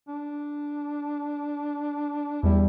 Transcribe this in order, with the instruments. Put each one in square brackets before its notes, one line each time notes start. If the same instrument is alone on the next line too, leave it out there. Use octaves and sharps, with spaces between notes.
[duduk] D4
[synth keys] E2 G3 [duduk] E4